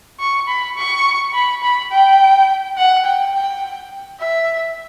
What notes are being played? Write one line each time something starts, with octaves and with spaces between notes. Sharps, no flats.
C#6
B5
C#6
B5
B5
G5
F#5
G5
G5
E5